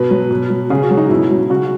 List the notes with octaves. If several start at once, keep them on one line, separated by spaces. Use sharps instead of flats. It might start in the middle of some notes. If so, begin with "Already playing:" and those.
Already playing: B2 B4
F#3
B2
F#3
C#3 G#4
F#4
F#3
D#4
B2 E4
F#3
C#3 F#4